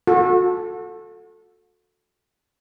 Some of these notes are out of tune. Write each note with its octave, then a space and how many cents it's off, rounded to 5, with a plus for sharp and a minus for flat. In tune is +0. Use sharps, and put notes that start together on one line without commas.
F#4 -35 A4 +0